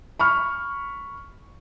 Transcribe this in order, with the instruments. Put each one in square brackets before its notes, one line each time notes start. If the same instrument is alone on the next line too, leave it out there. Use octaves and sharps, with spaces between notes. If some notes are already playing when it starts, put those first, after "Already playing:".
[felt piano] B5 C#6 F6